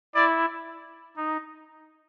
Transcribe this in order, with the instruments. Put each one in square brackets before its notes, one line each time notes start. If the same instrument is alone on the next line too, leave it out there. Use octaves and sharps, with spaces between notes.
[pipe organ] E4 [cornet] D5
[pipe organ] D#4